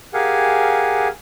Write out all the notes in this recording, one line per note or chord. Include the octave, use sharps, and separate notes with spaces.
G4 G#4 A#4 F5 F#5 G#5